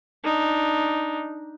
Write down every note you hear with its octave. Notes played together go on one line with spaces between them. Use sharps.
D4 D#4